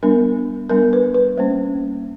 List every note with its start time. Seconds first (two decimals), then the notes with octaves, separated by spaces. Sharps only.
0.03 G3 B3 D4 A#4
0.69 G3 B3 D4 A#4
0.93 B4
1.14 B4
1.37 G3 A#3 C#4 C5